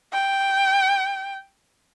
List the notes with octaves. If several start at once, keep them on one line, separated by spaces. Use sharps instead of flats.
G5